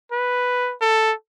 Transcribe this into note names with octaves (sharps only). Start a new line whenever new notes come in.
B4
A4